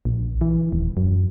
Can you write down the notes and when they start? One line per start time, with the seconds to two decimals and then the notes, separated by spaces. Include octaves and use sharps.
0.05 A#1
0.41 E3
0.72 D#1
0.97 F#2